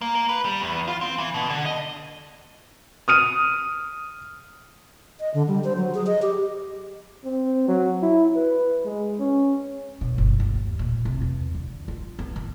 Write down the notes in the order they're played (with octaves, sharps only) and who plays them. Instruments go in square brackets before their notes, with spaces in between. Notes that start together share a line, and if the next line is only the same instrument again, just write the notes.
[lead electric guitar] A#3
A#3
B4
G3
E2
F4
C4
E3
B2
D3
D#5
[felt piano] D#6 F6 D#7
[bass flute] D#5
D3
G3
C5
F#3
G#4
D#5
G4
[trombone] C4
F#3
E4
B4
G#3
C#4
[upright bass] B2
G1
D#2
A#2
C3
E2
D3
F4
B3
D#3